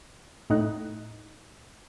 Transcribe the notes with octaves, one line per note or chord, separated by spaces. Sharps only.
A2 D#4 F#6